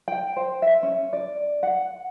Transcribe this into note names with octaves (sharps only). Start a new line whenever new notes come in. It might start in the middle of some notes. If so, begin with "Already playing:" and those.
G5
C5
E5
C#4
D5
F#5